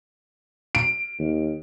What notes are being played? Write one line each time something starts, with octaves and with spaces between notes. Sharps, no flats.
D7
D#2